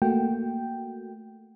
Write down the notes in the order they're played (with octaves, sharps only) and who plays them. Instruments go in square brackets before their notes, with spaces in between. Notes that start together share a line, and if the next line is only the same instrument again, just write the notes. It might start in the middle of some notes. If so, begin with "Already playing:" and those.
[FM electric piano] A3 A#3 F#4 G5